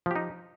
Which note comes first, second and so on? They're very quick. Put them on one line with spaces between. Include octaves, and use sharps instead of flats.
F3 G4 D#4